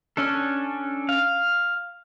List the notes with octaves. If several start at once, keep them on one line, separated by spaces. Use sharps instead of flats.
C#4 D4 A4
F5